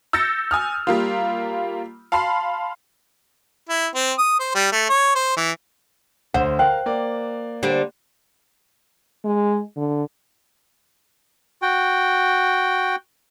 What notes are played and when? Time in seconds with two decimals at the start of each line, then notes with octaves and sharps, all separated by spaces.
0.13 E6 G6 A6 A#6 C#7
0.51 G#5 D#6 F6
0.87 G3 A#3 F4
2.12 F5 A5 B5 C6 C7
3.69 E4
3.95 C4
4.18 D#6
4.40 C5
4.55 G3
4.72 A3
4.89 C#5
5.15 C5
5.37 E3
6.34 D2 C5 F#5
6.59 A#4 F5 G5 F#6
6.86 A#3 D5
7.63 D3 G3 C5
9.25 G#3
9.77 D3
11.62 F#4 G5